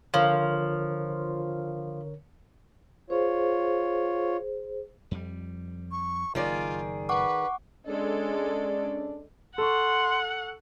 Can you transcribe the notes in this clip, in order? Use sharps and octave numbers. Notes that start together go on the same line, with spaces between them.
D3 F3 A#4 C#5
F4 G#4 C5 C#5
F2 G3
C#6
F#1 D#3 F4 G#4 D5
B4 F#5 C#6 D6
G#3 C#4 D4 A4 D5
A4 F#5 C6 C#6